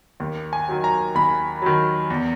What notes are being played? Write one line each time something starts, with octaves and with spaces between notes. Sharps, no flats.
D#2
G#5
D#3 F#3
A#5
D#2 B5
D#3 F#3
E2